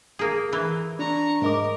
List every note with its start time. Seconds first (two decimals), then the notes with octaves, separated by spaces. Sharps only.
0.19 A#3 G#4
0.53 E3
0.99 D4 A#5 C#6
1.42 G#2 A#4 D#5 D6